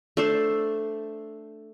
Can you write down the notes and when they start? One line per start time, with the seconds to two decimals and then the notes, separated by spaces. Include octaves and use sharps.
0.17 A3 D4 A4 C5